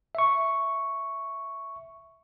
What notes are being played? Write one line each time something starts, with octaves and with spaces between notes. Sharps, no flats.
E5 C#6